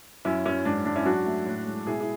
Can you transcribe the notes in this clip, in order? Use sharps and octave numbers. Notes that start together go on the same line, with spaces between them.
F#2 C#4 E4
F#2 C#4
G#2 D4
G#2 D4
C#4 E4
F#3 D4 F#4
A3
A2
G#3
B2 E4 G#4
E4 G#4